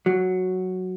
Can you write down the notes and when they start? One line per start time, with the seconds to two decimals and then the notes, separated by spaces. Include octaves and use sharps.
0.06 F#3